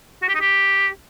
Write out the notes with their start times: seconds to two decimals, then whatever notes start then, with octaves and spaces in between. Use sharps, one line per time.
0.22 F#4
0.28 G4
0.34 D#4
0.40 G4